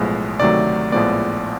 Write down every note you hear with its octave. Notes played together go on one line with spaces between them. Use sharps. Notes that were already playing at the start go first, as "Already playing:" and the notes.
Already playing: B1 A2 F3 G#3 B3
D2 C3 D#3 F#3 A3 D5
A#1 A2 F3 G#3 B3 D5